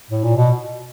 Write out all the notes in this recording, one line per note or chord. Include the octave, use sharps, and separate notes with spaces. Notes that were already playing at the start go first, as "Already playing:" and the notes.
A2
A#2
B2